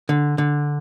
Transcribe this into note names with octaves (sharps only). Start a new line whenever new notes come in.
D3
D3